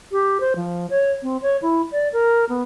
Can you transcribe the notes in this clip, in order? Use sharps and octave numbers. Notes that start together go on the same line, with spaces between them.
G4
C5
F3
C#5
C4
C#5
E4
D5
A#4
B3